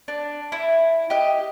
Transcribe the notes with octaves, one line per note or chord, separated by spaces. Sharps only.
D4
E4
G4 D#5